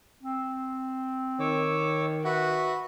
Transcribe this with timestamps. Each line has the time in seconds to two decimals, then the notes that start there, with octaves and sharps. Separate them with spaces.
0.23 C4
1.40 D#3 C#5 D6 E6
2.25 F#4 B4 E5